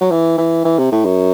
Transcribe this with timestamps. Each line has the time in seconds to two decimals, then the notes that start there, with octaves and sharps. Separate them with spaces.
0.01 F#3
0.11 E3
0.38 E3
0.65 E3
0.78 C3
0.92 A2
1.05 F#2